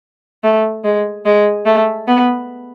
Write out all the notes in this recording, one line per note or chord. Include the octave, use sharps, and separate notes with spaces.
A3
G#3
G#3
A3
B3